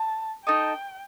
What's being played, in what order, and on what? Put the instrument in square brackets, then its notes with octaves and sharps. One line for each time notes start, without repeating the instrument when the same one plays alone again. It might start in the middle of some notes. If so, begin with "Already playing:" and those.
Already playing: [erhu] A5
[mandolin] D#4 A4 D#5 [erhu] G5